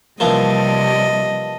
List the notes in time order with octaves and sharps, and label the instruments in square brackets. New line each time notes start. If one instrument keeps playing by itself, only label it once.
[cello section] C3 G3 [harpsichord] E3 F3 A#3 [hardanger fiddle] D#5 A5